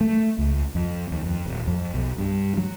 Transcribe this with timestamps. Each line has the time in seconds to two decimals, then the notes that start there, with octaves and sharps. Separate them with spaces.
0.01 A3
0.38 C#2
0.75 F2
1.11 D#2
1.26 F2
1.46 D#1
1.67 F2
1.94 B1
2.18 G2
2.58 F#3